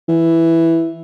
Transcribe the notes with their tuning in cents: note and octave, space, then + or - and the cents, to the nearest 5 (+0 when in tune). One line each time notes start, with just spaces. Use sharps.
E3 +0